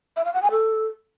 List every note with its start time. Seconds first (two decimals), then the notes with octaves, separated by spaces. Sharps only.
0.16 E5
0.25 F5
0.34 F#5
0.42 G#5
0.51 A4